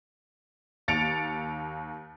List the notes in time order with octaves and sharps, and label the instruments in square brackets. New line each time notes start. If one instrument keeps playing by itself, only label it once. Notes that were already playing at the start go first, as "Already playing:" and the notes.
[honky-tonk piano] D#2 A6 C#7 D7 F7